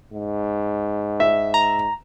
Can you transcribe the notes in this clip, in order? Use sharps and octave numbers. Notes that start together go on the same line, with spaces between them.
G#2
E5
A#5